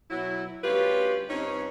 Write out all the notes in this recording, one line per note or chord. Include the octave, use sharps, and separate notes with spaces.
B2 F#3 E4
D2 G3 C#4 F4 G4 B4
G2 C4 C#4 D#4